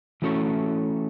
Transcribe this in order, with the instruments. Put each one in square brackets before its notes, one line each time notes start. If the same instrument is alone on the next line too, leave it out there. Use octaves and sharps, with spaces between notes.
[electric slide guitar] E3 A3 C#4 F#4 A4